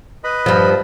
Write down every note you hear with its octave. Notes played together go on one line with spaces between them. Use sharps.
B4 D#5 B5
G2 F3